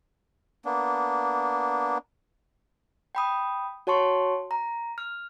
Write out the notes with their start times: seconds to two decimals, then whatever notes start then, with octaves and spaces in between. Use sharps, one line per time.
0.65 A#3 B3 D4
3.15 G5 B5 D#6
3.87 F#4 C#5 A5 C6 C#6
4.51 A#5
4.98 F6